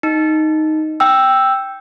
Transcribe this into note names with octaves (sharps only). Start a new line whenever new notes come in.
D#4
G5 E6